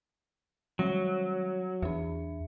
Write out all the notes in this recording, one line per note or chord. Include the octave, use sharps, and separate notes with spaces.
D#3 F#3 G3 A#6
E2 D4 E5